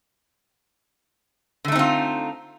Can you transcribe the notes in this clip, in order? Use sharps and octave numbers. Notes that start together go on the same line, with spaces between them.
D3 A3 C4 D#4 F4